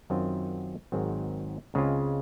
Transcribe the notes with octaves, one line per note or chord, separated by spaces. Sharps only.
F#2 D#3 F#3 C4 F4
G#1 G#2 D#3 F#3 C4
C#2 C#3 G#3 C4 F4